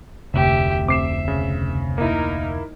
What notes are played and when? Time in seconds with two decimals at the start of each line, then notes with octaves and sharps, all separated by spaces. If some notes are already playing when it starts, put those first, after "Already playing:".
0.34 F1 D2 C3 G4 E5
0.88 C3 E5 D6 C7 E7
1.28 C#3
1.98 A#3 D#4 E4 A#4